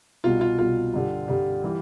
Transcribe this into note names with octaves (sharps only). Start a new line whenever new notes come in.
C2 B2 G3 F4
F4
C2 B2 G3 F4
G2 D3 G3
G2 D3 G3
E3 G3